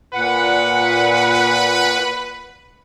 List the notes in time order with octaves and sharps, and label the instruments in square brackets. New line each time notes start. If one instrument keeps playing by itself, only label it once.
[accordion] A#2 F#5 [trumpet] B4